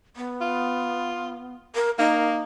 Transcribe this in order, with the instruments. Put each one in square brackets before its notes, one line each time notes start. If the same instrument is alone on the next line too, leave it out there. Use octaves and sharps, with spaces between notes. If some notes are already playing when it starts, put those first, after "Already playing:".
[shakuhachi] B3
[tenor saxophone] F4
[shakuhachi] A#4
[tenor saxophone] A#3 [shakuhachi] D#4